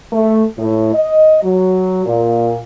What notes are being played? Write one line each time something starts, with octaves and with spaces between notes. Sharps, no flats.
A3
A2
D#5
F#3
A#2